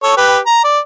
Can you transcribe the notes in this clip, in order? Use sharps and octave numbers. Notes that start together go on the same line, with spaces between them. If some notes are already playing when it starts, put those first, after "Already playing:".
A4 C#5
G4 B4
A#5
D5